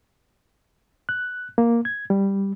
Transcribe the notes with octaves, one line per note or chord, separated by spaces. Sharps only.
F#6
A#3
G#6
G3